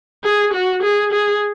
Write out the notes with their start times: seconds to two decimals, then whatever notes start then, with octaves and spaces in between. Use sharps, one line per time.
0.23 G#4
0.53 F#4
0.83 G#4
1.12 G#4